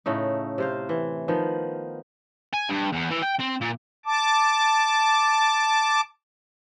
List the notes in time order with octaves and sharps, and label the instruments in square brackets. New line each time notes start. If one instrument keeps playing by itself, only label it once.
[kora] A2 C#3 A3 D#4
C3 C5 F5
E3
D#3 F3 B3
[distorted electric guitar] G#5
G2
E2
E3
G5
C4
A#2
[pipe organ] A5 D6